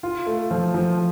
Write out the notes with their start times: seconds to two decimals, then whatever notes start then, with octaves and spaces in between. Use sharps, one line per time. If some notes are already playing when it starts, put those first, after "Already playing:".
0.03 F4
0.26 A3
0.51 F3
0.74 F3